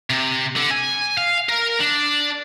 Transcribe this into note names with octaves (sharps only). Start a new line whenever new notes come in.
C3
D3
G#5
F5
A#4
D4